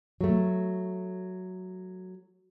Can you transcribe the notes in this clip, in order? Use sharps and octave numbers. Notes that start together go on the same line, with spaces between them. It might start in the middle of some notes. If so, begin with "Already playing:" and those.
F#3 A3